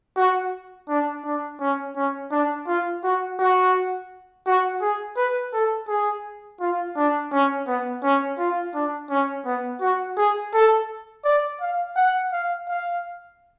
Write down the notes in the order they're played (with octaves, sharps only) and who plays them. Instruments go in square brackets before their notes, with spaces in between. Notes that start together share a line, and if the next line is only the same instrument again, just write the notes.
[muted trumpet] F#4
D4
D4
C#4
C#4
D4
F4
F#4
F#4
F#4
G#4
B4
A4
G#4
F4
D4
C#4
B3
C#4
F4
D4
C#4
B3
F#4
G#4
A4
D5
F5
F#5
F5
F5